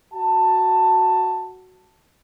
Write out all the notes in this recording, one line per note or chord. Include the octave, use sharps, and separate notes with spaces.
F#4 A5